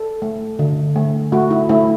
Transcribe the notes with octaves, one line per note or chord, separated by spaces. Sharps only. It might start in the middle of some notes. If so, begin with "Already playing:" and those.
Already playing: A4
A3
D3
A3
A3 F#4
E4
A3 E4